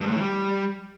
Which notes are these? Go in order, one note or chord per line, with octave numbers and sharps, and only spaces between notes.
G2
G#2
A2
E3
G3